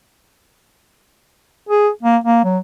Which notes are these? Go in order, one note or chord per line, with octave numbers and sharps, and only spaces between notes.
G#4
A#3
A#3
F#3